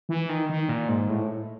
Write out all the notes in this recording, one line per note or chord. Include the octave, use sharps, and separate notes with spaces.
E3
D#3
D#3
A#2
G#2
A2